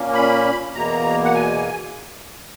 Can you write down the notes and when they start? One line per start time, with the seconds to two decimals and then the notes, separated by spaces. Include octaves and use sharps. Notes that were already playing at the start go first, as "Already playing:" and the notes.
Already playing: A#2 A#3 C#4
0.14 B5
0.73 E2 B2 A#3 A#5
1.24 F#5
1.34 G#5